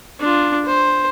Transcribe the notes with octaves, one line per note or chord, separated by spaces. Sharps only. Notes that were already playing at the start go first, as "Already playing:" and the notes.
D4 F4
C5